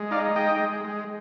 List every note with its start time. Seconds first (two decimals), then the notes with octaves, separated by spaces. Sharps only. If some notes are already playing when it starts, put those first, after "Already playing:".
Already playing: G#3
0.11 D#4 D5 F5
0.36 G#3 D#5 G5
0.60 G#3
0.84 G#3